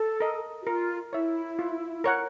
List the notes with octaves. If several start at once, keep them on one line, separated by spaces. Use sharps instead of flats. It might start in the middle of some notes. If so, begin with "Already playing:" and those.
Already playing: A4
A#4 D#5
F#4
F4 A#4
E4 C#5 E5
F4
A#4 C#5 F#5